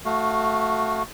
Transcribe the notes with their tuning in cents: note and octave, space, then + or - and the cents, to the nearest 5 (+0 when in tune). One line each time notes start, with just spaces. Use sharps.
A3 +0 F#4 +0 F5 +25